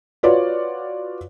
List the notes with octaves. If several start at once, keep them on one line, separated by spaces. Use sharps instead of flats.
F4 F#4 B4 C#5 D5